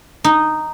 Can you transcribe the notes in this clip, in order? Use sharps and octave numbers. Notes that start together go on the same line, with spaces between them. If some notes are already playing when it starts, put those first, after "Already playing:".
D#4